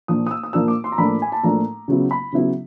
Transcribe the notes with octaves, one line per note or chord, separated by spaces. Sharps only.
A#2 F3 A#3 D4 D#6
D#6
E6
D#6
A#2 F3 A#3 D4 E6
D6
C6
A#5
A2 F3 A#3 D4 B5
G#5
A5
A2 F3 A#3 D4 A#5
C#3 F#3 B3 E4
B5
C#3 F#3 B3 E4